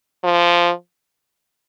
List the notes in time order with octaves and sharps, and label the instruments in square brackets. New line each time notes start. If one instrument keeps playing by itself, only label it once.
[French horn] F3